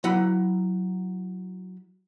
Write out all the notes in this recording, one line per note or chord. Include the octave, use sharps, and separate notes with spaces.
F#3 E4 F#5 B5